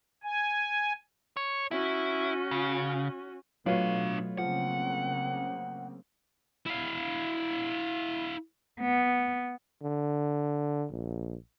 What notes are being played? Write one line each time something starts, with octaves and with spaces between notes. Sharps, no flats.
G#5
C#5
C#4 E4 F#4
C#3
B2 F#3 A3 D4 F4 B4 C#5 F5
C#3 F3 A#3 C4 F#5
E4 F5
B3
D3
A#1